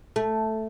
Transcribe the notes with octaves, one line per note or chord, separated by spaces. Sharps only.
A3